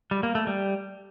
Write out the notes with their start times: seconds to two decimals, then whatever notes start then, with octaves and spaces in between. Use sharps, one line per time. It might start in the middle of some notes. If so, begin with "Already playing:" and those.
0.11 G3
0.23 A#3
0.35 A3
0.47 G3